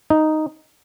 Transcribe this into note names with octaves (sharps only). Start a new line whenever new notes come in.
D#4